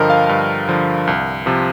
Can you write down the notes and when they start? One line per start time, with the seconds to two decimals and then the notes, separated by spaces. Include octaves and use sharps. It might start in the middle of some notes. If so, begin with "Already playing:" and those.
Already playing: G2 D3 F3 A#4 D#5 G5
0.10 F5
0.29 G2
0.68 D3 F3
1.07 C2
1.46 C3 F3